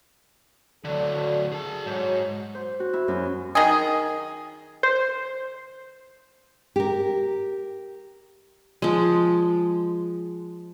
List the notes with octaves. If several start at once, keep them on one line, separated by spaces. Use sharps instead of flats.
D2 D3 F#3 A4 D5
G#4 A5
G#2 F#3 F#4 C#5
C5
F#4
E4
F#2
D#3 G#4
C5
G4 A#4
F3 G#3